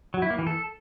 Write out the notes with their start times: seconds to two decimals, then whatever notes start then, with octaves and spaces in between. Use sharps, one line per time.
0.14 F#3
0.22 E4
0.30 A#3
0.38 E3
0.47 A4